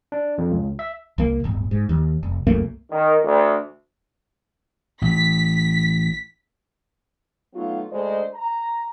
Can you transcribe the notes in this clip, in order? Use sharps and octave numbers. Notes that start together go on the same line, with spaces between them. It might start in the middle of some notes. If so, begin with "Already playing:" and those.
D4
F2
C#2
E5
C2 A#3
D1 G1
G#2
D#2
F1
C2 F#2 A3 A#3
D#3
D2
A1 B6
F#3 A3 B3 D#4 F4
D2 G#3 D4 A4 C5 D#5
A#5